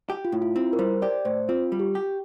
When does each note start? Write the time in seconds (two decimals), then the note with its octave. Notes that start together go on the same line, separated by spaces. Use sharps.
0.10 G4
0.25 F4
0.32 A2 E4
0.42 F4
0.56 C4 E4
0.73 A#4
0.79 G3 C5
1.02 G4 D5
1.25 A2 C5
1.49 C4 F4
1.72 G3
1.79 G4
1.95 G4